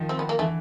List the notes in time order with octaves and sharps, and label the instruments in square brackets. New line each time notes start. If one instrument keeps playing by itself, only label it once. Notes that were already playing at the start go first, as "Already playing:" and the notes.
Already playing: [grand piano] D#3 F3
[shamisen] C4
B3
A#3
[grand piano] D3 E3 [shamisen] A3